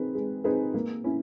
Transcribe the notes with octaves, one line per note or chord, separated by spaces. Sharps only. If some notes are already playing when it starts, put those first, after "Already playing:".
Already playing: C4 D#4 G#4 B4
G#3
C4 D#4 G#4 B4
A#3
C#4 E4